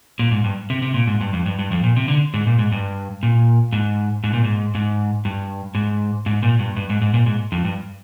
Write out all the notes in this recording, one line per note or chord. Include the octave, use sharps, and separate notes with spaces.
A#2
G#2
G2
C3
C3
A#2
G#2
G2
F2
G2
G2
F2
A#2
C3
D3
G#2
A#2
G#2
G2
A#2
G#2
G#2
A#2
G#2
G#2
G2
G#2
G#2
A#2
G2
G2
G#2
G#2
A#2
G#2
F2
G2